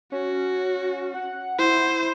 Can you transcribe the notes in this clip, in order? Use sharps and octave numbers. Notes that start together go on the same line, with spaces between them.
C#4 F#4
F#5
E4 C5